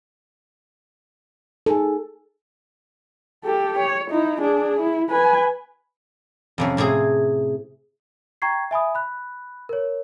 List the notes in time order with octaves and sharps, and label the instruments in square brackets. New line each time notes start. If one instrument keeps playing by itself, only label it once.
[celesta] D#4 G#4 G#5 [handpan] A4
[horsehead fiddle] G4 A4
C#5
D#4 E4
D4 G#4
E4
B4 G#5
[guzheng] F2 C3 C#4
A2 C3 E4 G#4
[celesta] G5 A#5 C#6 G#6 C7
E5 G#5 B5 D#6
B5 F#6
A#4 C#5